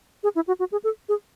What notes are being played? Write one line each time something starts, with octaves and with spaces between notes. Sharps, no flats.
G#4
E4
F#4
F#4
G#4
A4
G#4